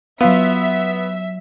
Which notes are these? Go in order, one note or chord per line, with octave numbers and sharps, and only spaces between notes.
F#3 B3 F4 E5 F5 E6